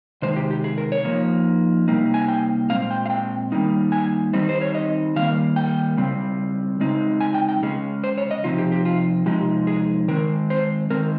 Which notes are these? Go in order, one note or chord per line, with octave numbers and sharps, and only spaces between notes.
C3 D#3 G#3 C5
G4
G4
G#4
A#4
C#5
F3 A#3 D#4
C3 G3 A#3 D#4
G#5
G5
A#2 G#3 C4 F5
G5
F5
G5
D#3 G3 A#3 D#4
G#5
D#3 G3 C4 D#4
C5
C#5
D#5
D#3 G3 A#3 F5
G5
C#3 G3 C4
C#3 G#3 C4 D#4
G#5
G5
G5
C#3 G#3 C#4 G#4
C5
C#5
D#5
C3 F3 C4 D#4 F4
G4
G4
F4
C3 F3 G#3 D#4 G4
G#4
D#3 G#3 C4 A#4
C5
D#3 G#3 C4 A#4